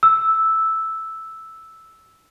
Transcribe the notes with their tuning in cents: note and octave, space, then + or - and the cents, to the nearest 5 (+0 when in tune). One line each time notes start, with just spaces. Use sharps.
E6 -5